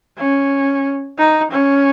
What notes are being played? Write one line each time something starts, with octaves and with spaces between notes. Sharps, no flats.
C#4
D#4
C#4